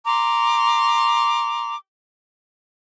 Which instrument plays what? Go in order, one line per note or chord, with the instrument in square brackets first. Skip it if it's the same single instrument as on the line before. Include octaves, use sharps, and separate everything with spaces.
[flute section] A#5 C6 D6